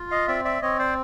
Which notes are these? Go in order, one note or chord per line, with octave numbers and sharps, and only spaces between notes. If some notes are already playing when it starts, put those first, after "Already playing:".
Already playing: F4
D#5 F5
C4 D5 E5
D5 E5
C4 C#5 D#5
C5 D5